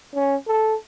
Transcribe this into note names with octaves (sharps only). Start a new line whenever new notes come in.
C#4
A4